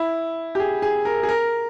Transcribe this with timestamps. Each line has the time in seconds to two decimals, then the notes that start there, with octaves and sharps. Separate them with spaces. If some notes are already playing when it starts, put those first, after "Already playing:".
Already playing: E4
0.55 G4
0.60 G#4
0.82 G#4
1.05 A#4
1.23 G#4
1.29 A#4